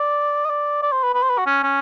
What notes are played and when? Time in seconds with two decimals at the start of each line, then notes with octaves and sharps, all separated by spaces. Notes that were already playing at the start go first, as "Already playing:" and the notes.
Already playing: D5
0.45 D#5
0.49 D5
0.82 D5
0.92 C5
1.03 B4
1.14 B4
1.23 C5
1.30 B4
1.38 F#4
1.46 C#4
1.63 C#4